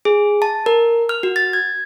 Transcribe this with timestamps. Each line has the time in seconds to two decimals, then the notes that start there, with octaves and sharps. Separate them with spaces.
0.05 G#4
0.42 A5
0.66 A#4
1.09 F6
1.23 F#4
1.36 A6
1.53 G#6